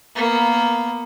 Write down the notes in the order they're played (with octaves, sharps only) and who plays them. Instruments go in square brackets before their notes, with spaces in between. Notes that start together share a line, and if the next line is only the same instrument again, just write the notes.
[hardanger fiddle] A#3 B3